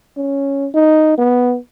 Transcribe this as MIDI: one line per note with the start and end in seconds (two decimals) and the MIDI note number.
0.17 0.68 61
0.74 1.15 63
1.18 1.57 59